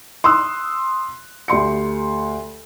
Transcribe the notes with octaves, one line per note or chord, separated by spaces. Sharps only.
C6 D#6 E6 F#6
D2 G4 C6 C#7